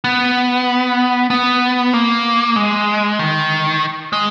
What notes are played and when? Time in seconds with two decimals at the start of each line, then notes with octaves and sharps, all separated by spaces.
0.04 B3
1.30 B3
1.94 A#3
2.56 G#3
3.19 D#3
4.13 G#3